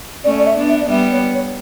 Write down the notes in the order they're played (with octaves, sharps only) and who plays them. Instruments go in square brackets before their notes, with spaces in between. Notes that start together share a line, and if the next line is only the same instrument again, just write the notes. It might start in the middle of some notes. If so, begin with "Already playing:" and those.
[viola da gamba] A3 C#4 [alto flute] D5
[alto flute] D5
E5
[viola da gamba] B3 D4
[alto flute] E5
D5
[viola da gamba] G3 B3 [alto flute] E5
[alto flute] C#5
C#5